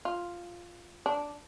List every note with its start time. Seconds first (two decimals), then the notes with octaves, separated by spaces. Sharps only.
0.05 F4
1.06 D4